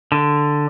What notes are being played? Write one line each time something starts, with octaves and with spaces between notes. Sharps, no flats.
D3